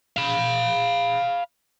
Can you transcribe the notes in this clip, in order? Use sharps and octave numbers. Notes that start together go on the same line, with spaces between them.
F5 B5